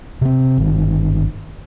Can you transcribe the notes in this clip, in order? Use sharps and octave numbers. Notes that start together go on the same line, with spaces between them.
C3 C4
G1 D#3